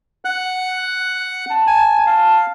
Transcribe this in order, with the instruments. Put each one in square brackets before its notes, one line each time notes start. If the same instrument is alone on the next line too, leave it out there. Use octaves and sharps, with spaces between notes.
[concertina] F#5 F#6
[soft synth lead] A5
[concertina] G#5
[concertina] F5 [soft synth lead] A5